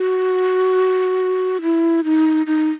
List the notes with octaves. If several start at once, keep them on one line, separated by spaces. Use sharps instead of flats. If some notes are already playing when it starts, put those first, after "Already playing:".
Already playing: F#4
E4
D#4
D#4